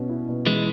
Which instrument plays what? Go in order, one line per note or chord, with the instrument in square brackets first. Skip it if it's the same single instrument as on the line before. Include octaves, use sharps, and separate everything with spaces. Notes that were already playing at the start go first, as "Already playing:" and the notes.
Already playing: [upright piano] B2 C#4
E4
B2
[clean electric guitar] E3 G#3 [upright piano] E4